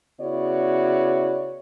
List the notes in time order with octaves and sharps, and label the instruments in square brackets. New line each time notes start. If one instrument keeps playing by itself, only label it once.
[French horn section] C#3 B3 E4 F#4 C#5 D5